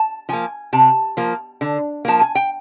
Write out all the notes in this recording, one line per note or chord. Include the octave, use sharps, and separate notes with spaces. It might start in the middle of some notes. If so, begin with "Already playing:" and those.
Already playing: A5
F3 A#3 G#5
C3 A5
F3 A#3
D3
F3 A#3 A5
G#5
G5